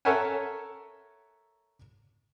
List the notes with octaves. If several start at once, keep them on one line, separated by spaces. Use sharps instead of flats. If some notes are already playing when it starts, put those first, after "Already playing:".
A4 A#4 C#5 E5 F#5 G#5